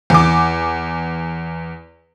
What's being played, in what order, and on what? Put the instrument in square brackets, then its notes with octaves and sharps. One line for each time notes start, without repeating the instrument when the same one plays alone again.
[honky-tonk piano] E2 D6